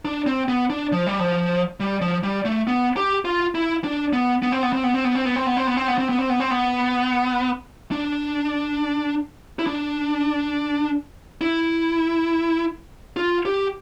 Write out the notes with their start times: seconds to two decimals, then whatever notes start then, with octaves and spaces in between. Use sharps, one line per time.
0.05 D4
0.27 C4
0.48 B3
0.70 D4
0.92 F3
1.07 G3
1.20 F3
1.80 G3
2.01 F3
2.23 G3
2.45 A3
2.67 B3
2.97 G4
3.25 F4
3.55 E4
3.84 D4
4.13 B3
4.42 B3
4.52 C4
4.63 B3
4.73 C4
4.84 B3
4.94 C4
5.04 B3
5.15 C4
5.25 B3
5.36 C4
5.46 B3
5.57 C4
5.67 B3
5.77 C4
5.88 B3
5.98 C4
6.09 B3
6.19 C4
6.30 B3
6.40 C4
6.51 B3
7.91 D4
9.59 E4
9.67 D4
11.41 E4
13.17 F4
13.45 G4